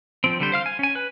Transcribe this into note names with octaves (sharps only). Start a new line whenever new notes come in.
F3 C4
D3 G3 C5
C5 F5 F6
G#5
C#4 G#5
B4